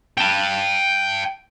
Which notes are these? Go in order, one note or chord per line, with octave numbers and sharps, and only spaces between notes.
G5 A5